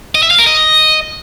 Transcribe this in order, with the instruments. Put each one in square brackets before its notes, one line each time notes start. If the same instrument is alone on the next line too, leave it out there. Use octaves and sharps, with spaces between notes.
[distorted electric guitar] D#5
E5
F5
A#4
D#5